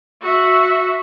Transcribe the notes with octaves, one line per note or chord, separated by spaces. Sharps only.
F#4 E5